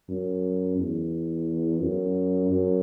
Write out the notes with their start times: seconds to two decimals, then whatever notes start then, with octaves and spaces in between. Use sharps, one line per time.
0.09 F#2
0.78 E2
1.82 F#2
2.51 F#2